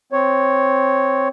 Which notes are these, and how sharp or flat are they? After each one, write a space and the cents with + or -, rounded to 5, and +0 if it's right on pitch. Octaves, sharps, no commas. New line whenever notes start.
C4 +0 C#5 +0